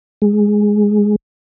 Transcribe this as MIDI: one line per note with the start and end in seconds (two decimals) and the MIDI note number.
0.22 1.16 56